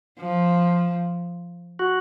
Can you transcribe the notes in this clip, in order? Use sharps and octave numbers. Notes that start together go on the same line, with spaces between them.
F3
F#4